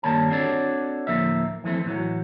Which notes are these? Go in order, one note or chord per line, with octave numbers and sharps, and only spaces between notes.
G2 D#3 G3 A#3 C#5 A5
C4 D4 F#4 A4 C#5 D5
D2 A2 D#3 F3 A#3 E5
E3 F3 A3 C4
A2 E3 F#3